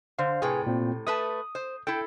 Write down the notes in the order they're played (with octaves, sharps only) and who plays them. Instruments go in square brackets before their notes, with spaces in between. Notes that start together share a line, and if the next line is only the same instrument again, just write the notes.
[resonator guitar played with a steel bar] D3 [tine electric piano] C5 F5
[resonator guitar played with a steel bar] A2 C3 G5 [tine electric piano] G#4 B4 G#5
[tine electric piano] A#2 C4
[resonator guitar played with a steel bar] A3 B4 A5 [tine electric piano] D#6
[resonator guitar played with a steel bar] C5
[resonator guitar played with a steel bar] E4 A4 [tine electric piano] G5